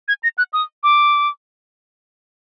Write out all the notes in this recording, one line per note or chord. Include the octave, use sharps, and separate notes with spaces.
G#6
A#6
F#6
D#6
D6